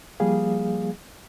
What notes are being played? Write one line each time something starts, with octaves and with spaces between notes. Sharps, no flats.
F3 G3 A#3 G#4 F5